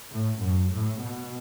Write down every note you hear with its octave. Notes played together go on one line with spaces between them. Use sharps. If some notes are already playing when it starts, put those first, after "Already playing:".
A2
F#2
A2
B2